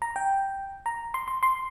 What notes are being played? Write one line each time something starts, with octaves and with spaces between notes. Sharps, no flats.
A#5
G5
A#5
C6
C6
C6